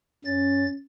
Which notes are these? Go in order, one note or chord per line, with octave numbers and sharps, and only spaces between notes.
F#2 C#4 A6